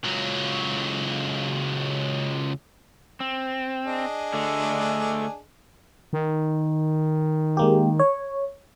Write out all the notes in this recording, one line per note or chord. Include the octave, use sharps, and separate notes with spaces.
C#2 F#3
C4
D4 G#4 D#5
D3 A3
D#3
G#3 A#3 G4
C#5